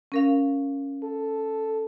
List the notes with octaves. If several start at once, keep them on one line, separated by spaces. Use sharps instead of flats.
C#4 A#4 F5
A4